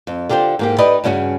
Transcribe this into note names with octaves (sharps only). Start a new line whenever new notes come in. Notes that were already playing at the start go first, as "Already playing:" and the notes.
F2
D3 F4 G4 B4 C5
G#2 A#3 G4
D#4 G4 B4 D5 D#5
G2 C#3 C#4 F#4